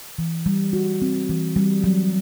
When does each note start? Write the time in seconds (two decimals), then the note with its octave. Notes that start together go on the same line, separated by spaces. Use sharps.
0.18 E3
0.46 G3
0.73 F#4
1.02 C4
1.29 E3
1.56 G3
1.84 F#3